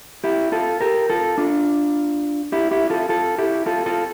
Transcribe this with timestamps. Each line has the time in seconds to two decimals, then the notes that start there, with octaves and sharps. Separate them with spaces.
0.24 E4 G4
0.52 F4 A4
0.81 G4 A#4
1.10 F4 A4
1.38 D4 F4
2.52 E4 G4
2.71 E4 G4
2.90 F4 A4
3.09 F4 A4
3.38 E4 G4
3.66 F4 A4
3.86 F4 A4